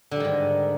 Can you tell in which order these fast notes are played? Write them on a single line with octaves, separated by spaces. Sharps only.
D3 G3 D#3 G#2